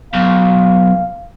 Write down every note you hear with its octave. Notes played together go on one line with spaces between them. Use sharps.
B1 F5